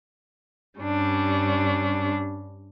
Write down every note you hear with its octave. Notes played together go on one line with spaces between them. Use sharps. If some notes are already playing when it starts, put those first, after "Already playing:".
G2 G3 C#4 D4